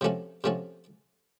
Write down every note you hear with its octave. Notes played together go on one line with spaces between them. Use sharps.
C3 F3 A3 C#4 F#4
C3 F3 A3 C#4 F#4